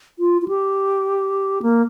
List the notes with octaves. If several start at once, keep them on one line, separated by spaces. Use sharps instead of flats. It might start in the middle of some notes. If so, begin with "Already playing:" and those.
F4
F4
G4
A#3